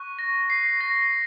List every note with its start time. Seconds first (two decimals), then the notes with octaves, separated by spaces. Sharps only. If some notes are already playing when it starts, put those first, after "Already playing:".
Already playing: C#6 F#6
0.19 A#6
0.50 C7
0.81 A#6